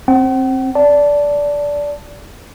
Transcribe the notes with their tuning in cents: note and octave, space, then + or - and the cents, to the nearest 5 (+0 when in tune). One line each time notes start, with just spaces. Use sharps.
C4 +20 F#5 +45
D5 -15 A5 +0